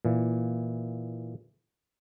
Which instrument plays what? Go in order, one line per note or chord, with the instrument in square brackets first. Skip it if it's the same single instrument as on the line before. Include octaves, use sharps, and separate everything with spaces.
[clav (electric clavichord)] A#2 E3